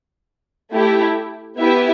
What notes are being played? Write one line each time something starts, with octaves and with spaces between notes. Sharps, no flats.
A3 E4 G4
B3 E4 G4 B4 E5